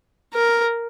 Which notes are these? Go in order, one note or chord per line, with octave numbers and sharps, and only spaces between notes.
A#4